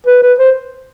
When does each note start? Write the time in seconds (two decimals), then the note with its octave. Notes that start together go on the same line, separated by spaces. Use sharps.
0.06 B4
0.22 B4
0.39 C5